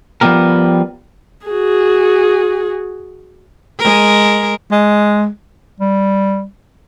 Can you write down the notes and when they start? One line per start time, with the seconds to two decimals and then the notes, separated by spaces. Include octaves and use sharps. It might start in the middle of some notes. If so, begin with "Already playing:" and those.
0.21 F3 G3 B3 G4 A#4
1.46 F#4 G#4
3.79 G#3 A#4
4.72 G#3
5.80 G3